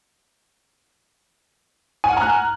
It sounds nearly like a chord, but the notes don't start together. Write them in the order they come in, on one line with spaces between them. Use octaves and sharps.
G#5 F#5 F6 A#5 F#6